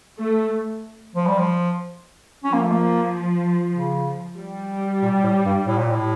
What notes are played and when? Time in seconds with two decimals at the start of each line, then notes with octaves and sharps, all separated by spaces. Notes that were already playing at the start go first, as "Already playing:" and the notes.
0.18 A3
1.15 F3
1.27 G3
1.38 F3
2.44 F3 C#4
2.53 A#3
2.62 A3
2.71 A#3
3.73 C#3
4.37 G3
5.02 A#2
5.23 A2
5.46 G2
5.67 A2
5.78 A#2
5.90 A2